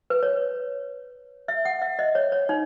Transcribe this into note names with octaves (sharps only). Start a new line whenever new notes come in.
B4
C#5
E5
F#5
E5
D#5
C#5
C#5
D#4